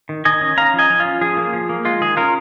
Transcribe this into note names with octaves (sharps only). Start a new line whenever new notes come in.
D#3
D#3 D#5 G#5
C#4
C#4 F5 A#5
F3
D#5 G#5
F3
F4
C#4
F3 G#4
A#3
F3
A#3
G#3 F4
D#3 G#4
C#4 F4 A#4